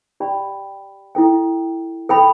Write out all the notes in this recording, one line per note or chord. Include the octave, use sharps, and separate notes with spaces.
G4 D5 G5 B5
E4 A4 G5
A4 G5 B5